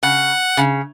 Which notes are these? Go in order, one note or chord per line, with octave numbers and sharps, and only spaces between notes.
C#3 F#5
C#3